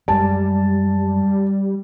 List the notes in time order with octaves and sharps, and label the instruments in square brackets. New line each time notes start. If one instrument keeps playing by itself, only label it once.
[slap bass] F#2 G#3 [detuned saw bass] G3 [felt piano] A5